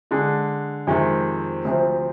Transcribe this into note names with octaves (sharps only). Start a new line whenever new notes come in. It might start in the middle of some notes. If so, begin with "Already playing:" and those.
D3 G#3 D4 G#4
F2 C3 D#3 G#3
D2 C3 F3 C4